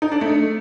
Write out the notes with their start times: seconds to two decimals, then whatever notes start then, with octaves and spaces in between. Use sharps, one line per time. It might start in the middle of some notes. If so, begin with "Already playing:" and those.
0.02 D#4
0.12 D4
0.21 A3